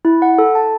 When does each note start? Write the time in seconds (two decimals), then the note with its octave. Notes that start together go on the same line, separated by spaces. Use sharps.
0.05 E4
0.22 F#5
0.38 A4
0.55 A5